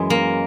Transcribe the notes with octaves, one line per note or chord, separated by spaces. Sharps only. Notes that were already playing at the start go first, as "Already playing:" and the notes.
Already playing: F#2 E3 G#3
A#3